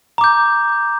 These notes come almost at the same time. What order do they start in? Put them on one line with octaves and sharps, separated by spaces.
A#5 D6 G6